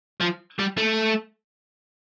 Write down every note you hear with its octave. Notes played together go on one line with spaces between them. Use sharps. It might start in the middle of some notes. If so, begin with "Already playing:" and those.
F3
G3
A3